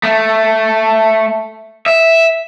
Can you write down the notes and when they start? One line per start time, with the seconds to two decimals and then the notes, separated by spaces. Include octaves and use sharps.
0.03 A3
1.86 E5